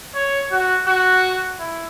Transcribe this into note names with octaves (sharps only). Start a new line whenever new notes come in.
C#5
F#4
F#4
E4